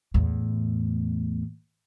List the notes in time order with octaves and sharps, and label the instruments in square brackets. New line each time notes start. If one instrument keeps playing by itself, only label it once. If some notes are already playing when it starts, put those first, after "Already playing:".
[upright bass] E2 A2